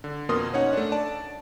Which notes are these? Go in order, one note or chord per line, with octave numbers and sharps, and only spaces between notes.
D3
F2 B2 A#3 A#4 C6 D#6
C#4 D#4 C#5 F#5
A3 D4
D5 A5